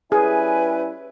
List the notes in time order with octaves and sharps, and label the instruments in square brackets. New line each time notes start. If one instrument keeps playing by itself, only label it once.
[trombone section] G3 C#4 E4 [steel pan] G#4 [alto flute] B4 [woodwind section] G#5